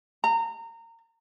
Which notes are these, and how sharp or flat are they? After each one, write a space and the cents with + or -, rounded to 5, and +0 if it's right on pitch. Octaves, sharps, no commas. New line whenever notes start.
A#5 -30